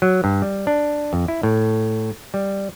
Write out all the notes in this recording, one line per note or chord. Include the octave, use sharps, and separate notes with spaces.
F#3
G2
G3
D4
F2
E4
A2
G3